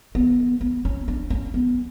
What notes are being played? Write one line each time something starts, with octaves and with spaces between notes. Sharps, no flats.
B3
B3
C#4
D4
C#4
B3